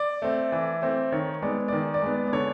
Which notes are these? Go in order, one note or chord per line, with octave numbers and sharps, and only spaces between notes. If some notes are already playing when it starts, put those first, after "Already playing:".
Already playing: D5
A3 C4
E3
A3 C4
D#3 C#5
G#3 B3 D5
D#3 D5
D5
G#3 B3
D5
D3 C#5